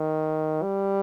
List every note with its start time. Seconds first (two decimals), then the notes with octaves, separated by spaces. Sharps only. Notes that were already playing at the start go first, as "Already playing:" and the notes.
Already playing: D#3
0.62 G3